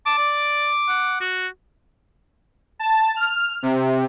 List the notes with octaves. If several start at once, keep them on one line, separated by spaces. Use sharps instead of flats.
A5 D6
D5
F#5
F#4
A5
F6
C3